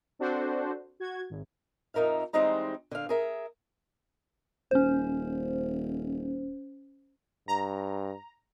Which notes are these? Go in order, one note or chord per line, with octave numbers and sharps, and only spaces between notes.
C4 D4 F#4 A4 C5
F#4 G#6
G#1
F2 D#4 A#4 E5 F5
E3 G3 G#3 C4 D#4 A#5
D3 F5
G#4 A#4 E5
D#1 C#4 C5
G2 A#5